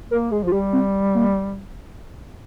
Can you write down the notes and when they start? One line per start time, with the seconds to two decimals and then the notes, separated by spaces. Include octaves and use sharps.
0.10 A#3 A#4
0.31 G#3 G#4
0.43 F3 F4
0.52 G3 G4
0.73 C4
1.15 A#3